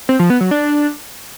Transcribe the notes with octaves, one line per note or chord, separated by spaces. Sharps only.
C4
F3
B3
F#3
D4